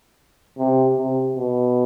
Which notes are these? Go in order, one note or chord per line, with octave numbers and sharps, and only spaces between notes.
C3
C3
B2